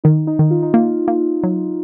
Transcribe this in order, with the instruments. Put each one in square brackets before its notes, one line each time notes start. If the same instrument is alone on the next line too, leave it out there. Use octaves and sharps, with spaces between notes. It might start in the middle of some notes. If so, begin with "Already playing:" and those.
[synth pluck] D#3 [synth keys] D#4
[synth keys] D#4
[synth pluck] D#3
[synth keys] F4
D#4
[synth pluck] A#3 [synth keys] F4
[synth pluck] A#3
F#3